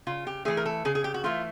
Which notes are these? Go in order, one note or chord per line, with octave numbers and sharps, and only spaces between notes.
C#3 F4
G4
E3 A3 G#4
A#4
A4
C#3 G#4
G#4
G4
F#4
E3 A3 F4